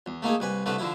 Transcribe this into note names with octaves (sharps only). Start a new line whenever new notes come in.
E2
A3 A#3 D#4 G#4
C2 B4 G#5
C2 D3 A3 B4
D3 F3 E4